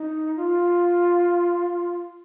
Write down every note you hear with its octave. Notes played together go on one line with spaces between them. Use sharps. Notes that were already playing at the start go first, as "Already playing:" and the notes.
Already playing: D#4
F4